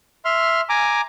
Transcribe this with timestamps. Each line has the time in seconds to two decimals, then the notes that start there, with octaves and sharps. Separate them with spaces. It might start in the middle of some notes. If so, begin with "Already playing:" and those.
0.25 E5 C6 F6
0.69 G#5 A#5 D6